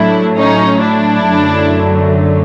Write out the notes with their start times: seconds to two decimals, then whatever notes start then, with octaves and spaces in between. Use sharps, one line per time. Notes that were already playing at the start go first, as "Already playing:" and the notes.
Already playing: A2 F#3 A3 D4 E4
0.35 C#4 D#4
0.81 D4 E4
1.27 F#2 D3 F#3 A3